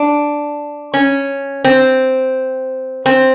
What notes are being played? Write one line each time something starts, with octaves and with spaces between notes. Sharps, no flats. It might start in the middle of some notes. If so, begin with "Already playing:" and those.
Already playing: D4
C#4
C4
C4